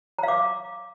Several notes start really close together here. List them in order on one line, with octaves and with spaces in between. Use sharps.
A#5 F5 D6